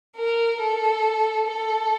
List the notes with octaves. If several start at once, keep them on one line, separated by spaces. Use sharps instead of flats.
A#4
A4
A4